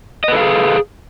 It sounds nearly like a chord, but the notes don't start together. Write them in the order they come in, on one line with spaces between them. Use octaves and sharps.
D#5 B4 A4 F5 G#4